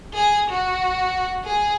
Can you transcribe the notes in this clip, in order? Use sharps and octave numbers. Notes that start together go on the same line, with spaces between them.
G#4
F#4
G#4